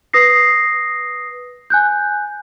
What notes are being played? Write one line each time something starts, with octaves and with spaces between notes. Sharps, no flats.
B4 D#6 A#6 C7
G#5 F#6 G6